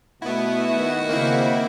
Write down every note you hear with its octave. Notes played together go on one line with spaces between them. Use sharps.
B2 A3 B3 E4 F#4
D#3
C#3 A#3 C4 E4